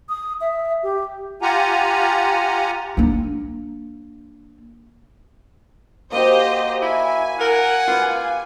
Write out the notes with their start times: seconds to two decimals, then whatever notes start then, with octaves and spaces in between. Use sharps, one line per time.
0.09 D#6
0.41 E5
0.83 G4
1.42 F4 G4 F#5 G#5 A#5
2.97 A#3 D4
6.12 A#3 F#4 G4 C5 D#5
6.82 E4 G#5
7.40 A#4 F#5
7.87 F4 G4 B4 F5